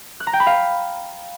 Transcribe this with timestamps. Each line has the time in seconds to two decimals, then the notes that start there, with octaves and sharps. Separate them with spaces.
0.20 F#6
0.27 A#5
0.33 G5
0.40 B5
0.46 F5